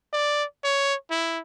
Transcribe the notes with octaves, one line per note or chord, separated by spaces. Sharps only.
D5
C#5
E4